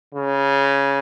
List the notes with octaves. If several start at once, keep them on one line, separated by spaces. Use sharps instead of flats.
C#3